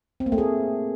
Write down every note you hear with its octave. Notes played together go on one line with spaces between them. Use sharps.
C4
A#3
A3
G#4